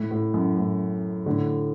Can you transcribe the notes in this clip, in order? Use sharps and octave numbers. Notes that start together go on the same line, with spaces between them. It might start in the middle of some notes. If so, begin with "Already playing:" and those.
Already playing: A2
A2
F#2
A2
A2 D3